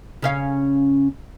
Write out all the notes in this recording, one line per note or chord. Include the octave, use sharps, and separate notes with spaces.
C#3 C#4 F5